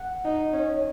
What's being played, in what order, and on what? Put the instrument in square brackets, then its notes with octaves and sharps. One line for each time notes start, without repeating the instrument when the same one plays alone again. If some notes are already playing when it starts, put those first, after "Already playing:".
Already playing: [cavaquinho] F#5
[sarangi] D#4
C#4